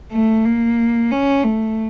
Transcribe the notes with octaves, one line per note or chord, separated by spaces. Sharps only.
A3
A#3
C#4
A3